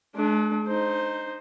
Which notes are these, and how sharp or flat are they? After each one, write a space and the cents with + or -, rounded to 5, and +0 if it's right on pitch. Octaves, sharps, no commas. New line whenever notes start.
G#3 +45 D4 +0
D#4 -10 C5 +0